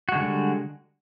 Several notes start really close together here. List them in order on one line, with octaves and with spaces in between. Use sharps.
F#4 G#3 D3 G3